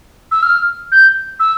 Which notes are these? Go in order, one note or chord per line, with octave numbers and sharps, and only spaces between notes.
E6
F6
G6
E6